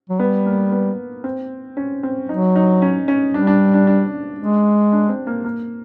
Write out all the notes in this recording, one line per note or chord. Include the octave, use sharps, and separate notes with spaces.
F#3
G3 B3
A#3
B3
C4
C#4
C4
F#3 D#4
D#4
C#4
C#4
G3 D4
D4
D4
D4
G#3
D4
C4
A#3
A#3